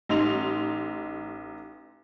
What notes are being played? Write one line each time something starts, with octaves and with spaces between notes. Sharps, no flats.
A1 D#4 C6 F7